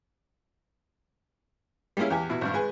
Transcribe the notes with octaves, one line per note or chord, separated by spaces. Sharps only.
G3 G#3 A#3 C#4 E4
E2 G4 G#5
B2 E4
G#1 G2
G#3 B4 G#5